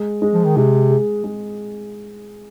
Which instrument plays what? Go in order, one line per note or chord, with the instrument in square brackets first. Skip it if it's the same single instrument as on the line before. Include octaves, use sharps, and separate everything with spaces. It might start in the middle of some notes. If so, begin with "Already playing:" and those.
Already playing: [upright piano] G#3
G#3
[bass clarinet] F3
D#3
[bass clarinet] C3 [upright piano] G#3
[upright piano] G#4
G#3